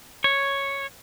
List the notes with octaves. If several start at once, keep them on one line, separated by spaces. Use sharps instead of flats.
C#5